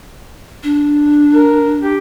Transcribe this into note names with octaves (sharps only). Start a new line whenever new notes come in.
D4
A#4
G4